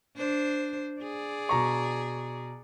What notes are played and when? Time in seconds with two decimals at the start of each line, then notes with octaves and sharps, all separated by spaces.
0.16 D4 C5
1.02 G#4 D5
1.49 B2 A#5 C#6